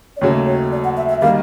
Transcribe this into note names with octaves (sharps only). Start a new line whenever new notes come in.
D5
D#2 C#3 F#3 A3 C#5
C#5
D5
F#5
E5
E5
D#3 G3 A#3 F5